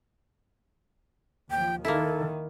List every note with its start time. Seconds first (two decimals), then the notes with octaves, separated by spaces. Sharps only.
1.51 D#2 F3 G5
1.85 D#3 A#3 E4 A4